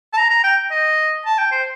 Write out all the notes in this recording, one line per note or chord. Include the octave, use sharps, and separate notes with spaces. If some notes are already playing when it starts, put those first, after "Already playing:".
A5
A#5
A#5
G5
D#5
A5
G5
C5